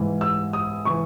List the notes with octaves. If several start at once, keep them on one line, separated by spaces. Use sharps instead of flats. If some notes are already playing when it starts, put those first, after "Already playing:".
Already playing: G#2 E3
E6
D#6
E3 C#6